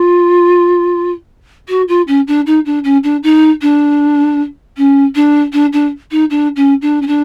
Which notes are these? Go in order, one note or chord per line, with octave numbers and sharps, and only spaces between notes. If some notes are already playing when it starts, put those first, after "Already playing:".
Already playing: F4
F#4
F4
C#4
D4
D#4
D4
C#4
D4
D#4
D4
C#4
D4
D4
D4
D#4
D4
C#4
D4
C#4
D4